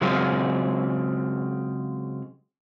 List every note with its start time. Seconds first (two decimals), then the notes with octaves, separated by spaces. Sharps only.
0.01 C#3 F#3 G#3 C4 F4 G#4